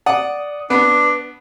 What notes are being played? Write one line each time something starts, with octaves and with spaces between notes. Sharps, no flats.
D5 F#5 D#6
B3 D4 B4